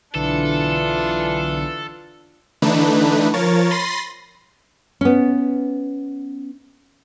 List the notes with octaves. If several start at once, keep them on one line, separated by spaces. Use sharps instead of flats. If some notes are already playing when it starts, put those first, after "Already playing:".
B1 D3 E3 D4 F4 A4 C#7
D3 E3 A3 D4 D#4 B4
F3 A#4 C#5 A6
B5 C6 A6 A#6 C7 D#7
B3 C#4